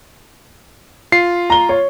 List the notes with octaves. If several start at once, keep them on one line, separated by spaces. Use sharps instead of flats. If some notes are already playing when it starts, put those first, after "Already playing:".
F4 C7
A#5 G7
C#5